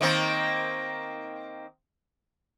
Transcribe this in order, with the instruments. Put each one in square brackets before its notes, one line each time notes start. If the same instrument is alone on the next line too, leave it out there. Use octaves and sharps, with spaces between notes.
[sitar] D#3 A#3 C4